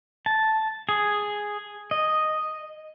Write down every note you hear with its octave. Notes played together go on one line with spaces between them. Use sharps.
A5
G#4
D#5